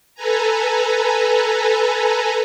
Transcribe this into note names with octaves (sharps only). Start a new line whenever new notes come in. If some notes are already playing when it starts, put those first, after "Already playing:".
A4 B4 G#5 A#5